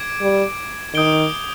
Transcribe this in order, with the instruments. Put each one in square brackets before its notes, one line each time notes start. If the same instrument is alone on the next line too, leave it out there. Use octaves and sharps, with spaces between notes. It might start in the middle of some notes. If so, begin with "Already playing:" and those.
Already playing: [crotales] D6 G#6 D7
[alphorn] G3
[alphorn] D#3 [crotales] D#6 G6 D7 G7